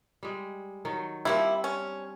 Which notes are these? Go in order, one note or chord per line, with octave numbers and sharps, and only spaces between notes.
G3 G#3
D#3 F#3
F3 G3 A#3 C4 D4 E4
C#4